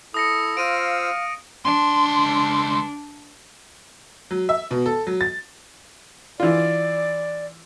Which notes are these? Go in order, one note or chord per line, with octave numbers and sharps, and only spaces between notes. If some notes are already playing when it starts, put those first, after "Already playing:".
E4 A4 D#6 A#6 C#7
F4 C5 F5 E6 D7 D#7
C#2 D4 C6
F#3
E5
B2
A4
F#3
A6
E3 F4 D5